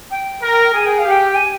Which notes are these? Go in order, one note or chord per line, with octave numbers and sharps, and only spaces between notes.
G5
A#4
G#4 G#5
G5
F5
G4
G5
G#5